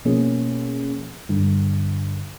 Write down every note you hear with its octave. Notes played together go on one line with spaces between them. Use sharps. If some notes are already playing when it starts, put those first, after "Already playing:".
B2 F3 A#3 C#4 G#4
G2 D3